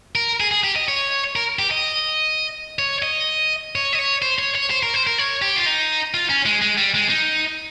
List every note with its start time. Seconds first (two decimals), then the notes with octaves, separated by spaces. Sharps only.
0.15 A#4
0.40 G#4
0.51 G#4
0.64 G4
0.76 D#5
0.88 C#5
1.36 A#4
1.59 G4
1.71 D#5
2.79 C#5
3.02 D#5
3.75 C#5
3.93 D#5
3.99 C#5
4.22 C5
4.39 C#5
4.55 C#5
4.70 C5
4.83 A#4
4.94 C5
5.07 A#4
5.18 C#5
5.42 G4
5.56 F4
5.66 D#4
6.14 F4
6.29 C#4
6.46 G#3
6.62 G#3
6.78 G3
6.95 G#3
7.10 D#4